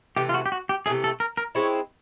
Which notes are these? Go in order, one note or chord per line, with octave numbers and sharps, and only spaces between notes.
C3 E3 A3 G4
F4
F#4
G4
F#4
G4
C3 E3 A3 G#4
A4
A#4
A#4
G#3 C4 E4 C#5